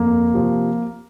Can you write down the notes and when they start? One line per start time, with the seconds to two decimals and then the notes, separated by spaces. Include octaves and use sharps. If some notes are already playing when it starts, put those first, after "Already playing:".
Already playing: F2 A#3
0.34 C3 F3